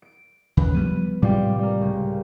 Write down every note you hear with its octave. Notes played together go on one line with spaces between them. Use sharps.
D7
D#2 C#3 B4 B5
F3 G3 B3 D#7
A2 C3 G3 G#3 F4 G4
G3 A#4
C#2